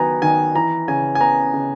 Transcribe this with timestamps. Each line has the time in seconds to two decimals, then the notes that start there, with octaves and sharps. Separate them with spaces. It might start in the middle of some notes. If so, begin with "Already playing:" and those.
Already playing: D#3 F#3 B3 G#5 A#5
0.22 D#3 G#5
0.55 E3 A#5
0.88 C#3 G#5
1.15 G#5
1.21 B3 A#5
1.54 C#3